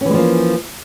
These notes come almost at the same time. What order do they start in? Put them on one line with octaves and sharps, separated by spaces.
C#4 E3 G#3 F3 A#3